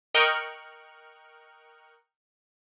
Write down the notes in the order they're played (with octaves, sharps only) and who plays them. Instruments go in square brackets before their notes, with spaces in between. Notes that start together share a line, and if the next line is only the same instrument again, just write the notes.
[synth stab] A#4 D#5 G5 C#6 F6 F#6